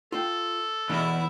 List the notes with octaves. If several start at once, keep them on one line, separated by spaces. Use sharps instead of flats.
F4 A4 G5
E2 B2 G#3 E4 E5